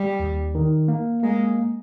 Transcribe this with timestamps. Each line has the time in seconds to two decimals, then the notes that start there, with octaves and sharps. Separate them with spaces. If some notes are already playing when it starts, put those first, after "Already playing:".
Already playing: G3
0.19 D#2
0.55 D#3
0.88 A#3
1.23 G#3 A#3